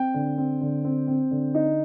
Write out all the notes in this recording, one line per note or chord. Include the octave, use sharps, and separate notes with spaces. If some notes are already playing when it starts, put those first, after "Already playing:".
Already playing: C4 G5
D3
C4
D3
C4
C4
D3
D#4